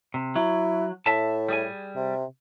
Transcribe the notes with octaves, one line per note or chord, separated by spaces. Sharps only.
C3
F#3 E4
A2 E5 A5
G3 G#4 G#5
C3